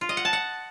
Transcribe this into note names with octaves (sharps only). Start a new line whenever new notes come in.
F4
D#5
F#5
A5
F#5